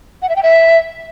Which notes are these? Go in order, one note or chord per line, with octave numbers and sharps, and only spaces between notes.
F#5
E5
G5
E5